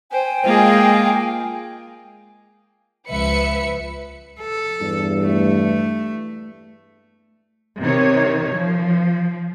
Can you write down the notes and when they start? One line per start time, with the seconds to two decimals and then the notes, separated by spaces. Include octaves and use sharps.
0.11 C5 G5 G#5
0.45 G#3 A#3 F4 G#4
3.11 C#2 F3 B4 E5 C#7
4.40 A4
4.81 E2 G2
5.23 A3
7.80 C3 D#3 C#5
8.56 F3